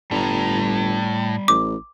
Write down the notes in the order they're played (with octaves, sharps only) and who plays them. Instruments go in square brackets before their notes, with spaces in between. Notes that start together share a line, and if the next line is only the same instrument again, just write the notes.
[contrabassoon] G1 [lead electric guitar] A2 [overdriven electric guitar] G3 A#5
[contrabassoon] A1 [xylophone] D6